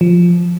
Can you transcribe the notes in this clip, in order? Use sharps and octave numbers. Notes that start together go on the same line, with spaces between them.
F3